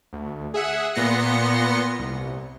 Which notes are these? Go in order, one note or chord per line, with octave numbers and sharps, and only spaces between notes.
D2
G#4 E5 F#5
A#2 B3 C6 A#6 C#7
C2